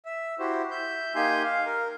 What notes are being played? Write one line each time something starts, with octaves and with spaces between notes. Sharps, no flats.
E5
E4 F#4 G4 C5
E5 G6
A#3 D#4 G4 G#5 C6 G6
F5
A#4